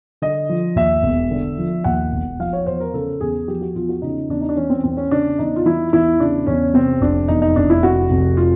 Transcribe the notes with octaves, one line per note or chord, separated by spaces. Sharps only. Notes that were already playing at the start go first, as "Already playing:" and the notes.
D3 D#5
F3
D#2 E5
E1
D3
F3
D#2 F#5
E1
F3 F5
C#5
E2 C5
A#4
C#3 A4
E2 G#4
F3 G4
F#4
E2 F4
F#4
C#3 D#4
E2 D4
D#4
D4
E3 C#4
C4
E2 C4
C#4
C#3 D4
E2 D#4
F4
E3 E4
E2 E4
C#3 D4
E2 C#4
C3 C4
F1 D4
E2 D#4
D#4
F1 D4
E4
C3 F#4
F1
F4